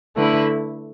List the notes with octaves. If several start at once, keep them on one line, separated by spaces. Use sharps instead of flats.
D3 A3 E4 B4